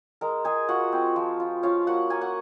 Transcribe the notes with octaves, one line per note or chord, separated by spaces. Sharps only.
G#3 A#4 A#5
G#3 G#4 G#5
F4 F#4 F#5
C4
F3
F4
C#4 F4 F5
A#3 F#4 F#5
A#3 G#5
F#5